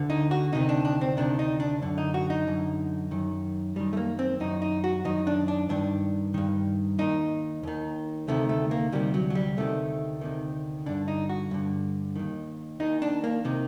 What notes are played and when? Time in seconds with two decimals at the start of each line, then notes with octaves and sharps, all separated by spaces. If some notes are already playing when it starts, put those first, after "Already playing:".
Already playing: D2 D3
0.10 D#4
0.31 F#4
0.53 D2 C3 D#3 D#4
0.69 D4
0.85 D4
1.01 C4
1.17 D2 C3 D#3 D4
1.39 D#4
1.60 D4
1.82 F#2 D3
1.98 D#4
2.14 F#4
2.30 D#4
2.47 F#2 D3
3.11 F#2 D#3
3.76 F#2 D#3 G3
3.93 A3
3.97 A#3
4.19 C4
4.40 F#2 D#3 D#4
4.62 D#4
4.84 F#4
5.05 F#2 D#3 D#4
5.27 D4
5.48 D4
5.69 G2 D#3 D4
6.34 G2 D#3
6.99 D#2 D#3 D#4
7.63 D#2 D#3
8.28 D2 C3 D#3 A3
8.49 A3
8.71 A#3
8.92 D2 C3 D#3 G3
9.14 F#3
9.30 F#3
9.35 G3
9.57 D2 C3 D#3 A3
10.21 D2 C3 D#3
10.86 G2 D3 D4
11.08 D#4
11.29 F#4
11.51 G2 D3
12.16 D#2 D#3
12.80 D#2 D#3 D#4
13.02 D4
13.24 A#3
13.45 C3 D#3